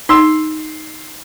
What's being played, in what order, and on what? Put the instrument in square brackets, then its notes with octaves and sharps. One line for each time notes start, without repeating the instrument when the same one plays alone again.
[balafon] D#4 [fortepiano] C6 E6